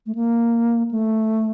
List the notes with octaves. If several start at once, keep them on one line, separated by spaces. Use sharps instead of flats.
A3
A#3
A3